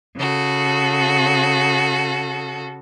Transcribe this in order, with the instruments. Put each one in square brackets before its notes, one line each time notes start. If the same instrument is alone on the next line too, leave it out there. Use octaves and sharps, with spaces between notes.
[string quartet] C#3 F#4 A4